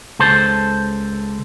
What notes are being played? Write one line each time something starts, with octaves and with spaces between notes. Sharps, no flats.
C#2 A4 C5